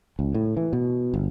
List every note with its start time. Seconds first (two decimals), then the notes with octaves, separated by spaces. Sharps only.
0.19 C#2
0.34 A2
0.57 E3
0.73 B2
1.14 G1